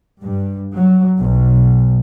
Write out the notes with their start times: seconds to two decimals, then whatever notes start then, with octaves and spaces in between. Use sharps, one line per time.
0.21 G2
0.75 F#3
1.20 B1